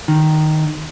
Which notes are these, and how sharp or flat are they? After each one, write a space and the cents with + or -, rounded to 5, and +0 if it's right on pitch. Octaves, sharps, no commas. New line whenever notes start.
D#3 -5